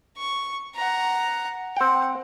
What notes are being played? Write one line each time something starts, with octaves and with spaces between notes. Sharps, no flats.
C#6
F#5 A#5
C4 F#5 G5